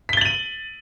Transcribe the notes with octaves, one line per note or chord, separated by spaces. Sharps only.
A6 B6 D#7 F#7 G7